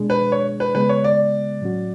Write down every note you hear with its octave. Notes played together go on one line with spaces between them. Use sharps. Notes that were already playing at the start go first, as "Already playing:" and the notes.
Already playing: B2 G#3 D4 G#4
B4
C#5
B4
C#3 G#3 B3 B4
C#5
D5
A2 F#3 C#4 F#4